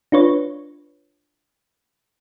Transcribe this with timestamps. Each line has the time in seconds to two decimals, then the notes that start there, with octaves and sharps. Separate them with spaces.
0.12 D4 F4 B4 C#5